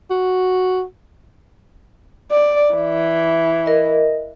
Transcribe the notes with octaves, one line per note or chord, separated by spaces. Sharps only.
F#4
D5
E3
A#4 D#5